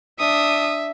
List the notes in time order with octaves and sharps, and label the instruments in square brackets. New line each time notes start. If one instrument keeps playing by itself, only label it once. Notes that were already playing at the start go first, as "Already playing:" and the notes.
[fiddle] D4 [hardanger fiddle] E5 [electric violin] D#6